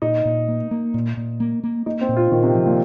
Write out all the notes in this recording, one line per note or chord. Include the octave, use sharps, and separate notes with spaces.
A#2 D#4
A#2
A#3
A#3
A#2
A#2
A#3
A#3
A#3 D#4
C4
A#2
F4
A#2 D#3
C3
F3
A#2